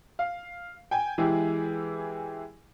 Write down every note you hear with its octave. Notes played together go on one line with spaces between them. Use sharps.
F5
G5 G#5
E3 G#3 E4 G4 G#4